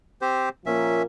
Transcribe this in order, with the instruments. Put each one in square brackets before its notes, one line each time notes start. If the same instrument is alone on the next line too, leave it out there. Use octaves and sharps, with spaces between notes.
[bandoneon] C4 G4 C5
[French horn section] A#2 F3 A#3 [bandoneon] C#4 E5